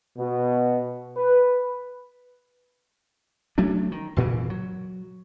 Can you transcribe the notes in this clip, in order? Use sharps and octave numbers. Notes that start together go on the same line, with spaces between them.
B2
B4
F#3 A3 C#4 D4
D#3
F#1 A#2 C#3 E3
F#3